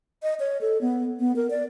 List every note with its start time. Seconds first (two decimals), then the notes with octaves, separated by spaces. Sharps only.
0.23 D#5
0.40 C#5
0.61 A4
0.81 B3
1.19 B3
1.36 A#4
1.50 D5